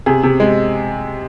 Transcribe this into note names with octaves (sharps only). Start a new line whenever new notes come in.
C3 G#4
C3
G#3